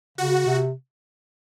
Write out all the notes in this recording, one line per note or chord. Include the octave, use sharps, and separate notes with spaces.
C#3 F#4
C3